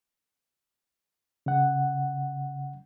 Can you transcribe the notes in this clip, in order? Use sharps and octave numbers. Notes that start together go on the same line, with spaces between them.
C#3 F#5